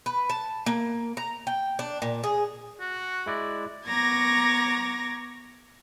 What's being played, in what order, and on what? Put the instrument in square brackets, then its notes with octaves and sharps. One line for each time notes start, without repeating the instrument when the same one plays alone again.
[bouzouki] B4
A5
A#3
A#5
G5
D4
A#2
G#4
[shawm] F#4
[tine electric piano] G#3 E4 D5
[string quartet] B3 A#5 C#6 D6 G#6 A#6